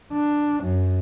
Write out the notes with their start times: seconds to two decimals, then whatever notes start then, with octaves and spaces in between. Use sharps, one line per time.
0.12 D4
0.63 F#2